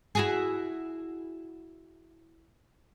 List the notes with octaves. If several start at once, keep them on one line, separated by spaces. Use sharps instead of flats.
E4 F#4 G#4